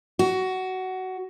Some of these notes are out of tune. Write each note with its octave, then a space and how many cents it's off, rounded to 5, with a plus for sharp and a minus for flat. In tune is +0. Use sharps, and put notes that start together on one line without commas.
F#4 +15